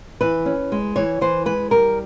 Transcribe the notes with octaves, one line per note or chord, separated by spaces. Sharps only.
E3 B4
C#4
G#3
E3 C#5
E3 C5
G#3 B4
G3 A#4